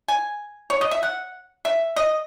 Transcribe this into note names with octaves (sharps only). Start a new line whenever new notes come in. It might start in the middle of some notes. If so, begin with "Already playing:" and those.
G#5
C#5
D#5
E5
F#5
E5
D#5